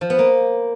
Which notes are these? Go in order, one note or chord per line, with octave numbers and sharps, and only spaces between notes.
F3
B3
A#3